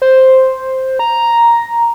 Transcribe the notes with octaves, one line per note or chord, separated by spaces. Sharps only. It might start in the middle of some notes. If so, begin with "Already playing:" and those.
C5
A#5